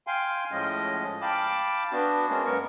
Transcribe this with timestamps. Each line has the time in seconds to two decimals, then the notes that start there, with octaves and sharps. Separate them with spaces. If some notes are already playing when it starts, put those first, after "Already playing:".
0.07 F5 G5 G#5 C6
0.52 A2 F3 G#3 C#4 D#5
1.22 F5 G5 A5 B5 D6
1.92 B3 D4 F#4
2.29 G#3 A#3 C#4
2.45 F#2 B3 A#4 C#6